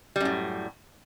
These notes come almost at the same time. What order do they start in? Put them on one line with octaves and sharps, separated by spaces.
G3 F#2 A2